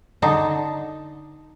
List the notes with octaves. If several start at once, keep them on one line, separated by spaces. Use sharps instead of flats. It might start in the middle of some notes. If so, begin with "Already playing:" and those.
D3 D#4 A5